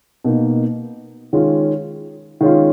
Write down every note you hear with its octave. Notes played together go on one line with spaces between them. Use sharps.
B2 A#3 D#4
D#3 G#3 C#4 F4
D#3 G#3 C#4 F4